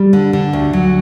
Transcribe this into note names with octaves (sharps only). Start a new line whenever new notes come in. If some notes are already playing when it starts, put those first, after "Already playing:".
Already playing: G3
D3
D3
D2
F#3